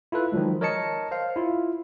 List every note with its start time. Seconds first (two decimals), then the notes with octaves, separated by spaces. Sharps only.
0.12 E4 F4 A4 B4
0.32 D#3 F3 F#3 G#3
0.61 A#4 C#5 D#5 A5 C#7
1.11 C5 F5
1.36 E4 F4